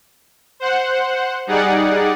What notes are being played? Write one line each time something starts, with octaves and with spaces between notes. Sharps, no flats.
C5 F#5
G3 D#4 G#4 D5 F#5